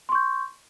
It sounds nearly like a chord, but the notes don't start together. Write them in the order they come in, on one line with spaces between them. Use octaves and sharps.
C6 C#6 G6